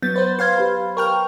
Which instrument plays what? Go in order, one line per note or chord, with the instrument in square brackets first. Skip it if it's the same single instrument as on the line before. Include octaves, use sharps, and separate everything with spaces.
[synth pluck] F#3 B3 A6 [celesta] G6
[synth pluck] B4 C5
[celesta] B4 G#6 [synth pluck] C5 F5 C6
[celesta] G4 B4 B5
[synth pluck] A#4 G5 F6 [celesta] C#6